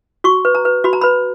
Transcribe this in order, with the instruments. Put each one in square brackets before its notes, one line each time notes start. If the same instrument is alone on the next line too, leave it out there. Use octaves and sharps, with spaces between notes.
[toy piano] F#4 C#6
B4
A#5
B4
F#4 B5
A#5
B4 B5